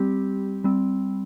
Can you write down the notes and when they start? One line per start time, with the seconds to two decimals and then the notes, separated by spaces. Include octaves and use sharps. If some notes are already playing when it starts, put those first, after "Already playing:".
Already playing: G3 C4 G4
0.64 G3 C4